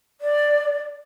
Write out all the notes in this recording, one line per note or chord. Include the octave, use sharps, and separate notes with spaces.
D5